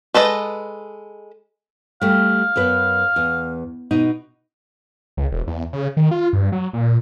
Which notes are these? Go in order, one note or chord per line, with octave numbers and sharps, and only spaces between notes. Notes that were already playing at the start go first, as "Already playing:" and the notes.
G#3 A4 B4 D#5
G3 A3 F5
F#2 B3 B4
E2
B2 D#4
C#2
E1
E2
C#3
D#3
F4
G2
F#3
A#2